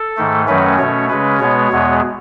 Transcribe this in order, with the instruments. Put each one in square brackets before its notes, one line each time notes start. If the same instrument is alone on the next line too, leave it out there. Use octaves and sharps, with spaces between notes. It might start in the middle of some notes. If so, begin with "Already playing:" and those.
Already playing: [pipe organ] A4
G#2 D#3 A3
F#2 D#3 F#3 A3 C#4 B4
B2 A3 C#4 C#5
C#3 G#3 C#4 B4
B2 G#3 B3 C#5
E2 B2 G#3 B3